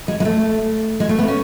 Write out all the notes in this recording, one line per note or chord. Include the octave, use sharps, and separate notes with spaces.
G#3
G#3
A3
G#3
A3
B3
C#4